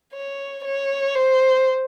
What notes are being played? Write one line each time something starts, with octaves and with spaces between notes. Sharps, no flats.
C#5
C#5
C5